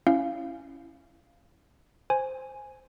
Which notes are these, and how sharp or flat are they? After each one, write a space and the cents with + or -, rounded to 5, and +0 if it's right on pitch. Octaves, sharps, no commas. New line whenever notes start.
C#4 +0 E4 +10 F5 -15
C5 -5 G#5 +0